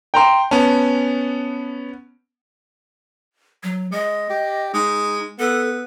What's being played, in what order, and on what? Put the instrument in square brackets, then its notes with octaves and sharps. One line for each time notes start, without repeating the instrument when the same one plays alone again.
[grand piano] G5 A#5 C6
[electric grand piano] B3 C#4 [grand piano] A5
[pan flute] F#3
[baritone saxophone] G#3 [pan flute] D#5
[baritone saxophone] G4
[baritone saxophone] G#3 [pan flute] D#4
[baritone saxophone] B3 [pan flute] A4